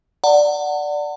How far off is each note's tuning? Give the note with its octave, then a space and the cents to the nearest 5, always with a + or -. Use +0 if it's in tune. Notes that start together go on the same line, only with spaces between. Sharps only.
D5 +0 F#5 +0 A5 +45